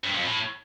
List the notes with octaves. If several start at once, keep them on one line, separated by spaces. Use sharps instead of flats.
G2
F2
A2